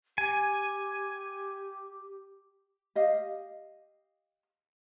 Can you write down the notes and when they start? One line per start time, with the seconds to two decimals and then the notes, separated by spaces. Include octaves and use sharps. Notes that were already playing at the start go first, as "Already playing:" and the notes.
0.18 G4 G#5
2.95 G4 D#5 F5